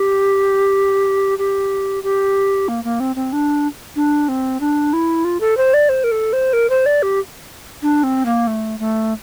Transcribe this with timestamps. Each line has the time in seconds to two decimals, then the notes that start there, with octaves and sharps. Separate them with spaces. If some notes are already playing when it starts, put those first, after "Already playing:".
Already playing: G4
1.38 G4
2.03 G4
2.68 A#3
2.84 A#3
3.00 C4
3.16 C4
3.33 D4
3.96 D4
4.28 C4
4.60 D4
4.93 E4
5.24 F4
5.40 A4
5.57 C5
5.74 D5
5.89 C5
6.04 A#4
6.11 A4
6.33 C5
6.53 A#4
6.70 C5
6.86 D5
7.02 G4
7.82 D4
8.03 C4
8.26 A#3
8.47 A3
8.79 A3